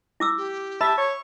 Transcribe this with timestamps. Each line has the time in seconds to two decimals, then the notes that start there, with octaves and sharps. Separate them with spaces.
0.20 E4 D6 E6
0.37 G4
0.81 E5 A5 B5
0.98 C#5 C#6